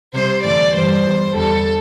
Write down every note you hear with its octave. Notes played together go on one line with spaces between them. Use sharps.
C3 G3 C5
E2 D3 A3 D5
G2 E3 G3 C5
E2 E3 G3
E2 D3 G3 A4